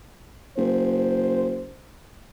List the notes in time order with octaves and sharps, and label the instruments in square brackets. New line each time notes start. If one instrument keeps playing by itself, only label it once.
[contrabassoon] F#1 [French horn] C5